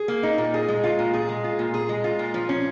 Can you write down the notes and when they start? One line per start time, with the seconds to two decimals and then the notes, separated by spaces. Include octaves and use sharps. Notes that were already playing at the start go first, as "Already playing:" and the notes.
Already playing: G#4
0.08 A#3
0.23 D#4
0.38 A#2
0.54 G#4
0.69 G#3
0.84 F4
0.99 A#2
1.14 G#4
1.29 G#3
1.44 F4
1.59 A#2
1.74 G#4
1.89 G#3
2.04 F4
2.19 A#2
2.34 F3
2.49 C#4